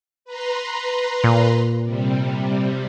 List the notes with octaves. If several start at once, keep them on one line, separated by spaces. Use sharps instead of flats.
B4 A#5 C6
A#2
C3 G3